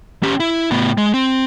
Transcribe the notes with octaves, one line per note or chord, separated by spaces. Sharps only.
C#4 G4
E4
A2 B3
G#3
C4